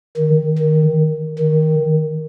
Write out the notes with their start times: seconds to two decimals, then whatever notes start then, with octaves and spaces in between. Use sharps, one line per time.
0.18 D#3
0.59 D#3
1.39 D#3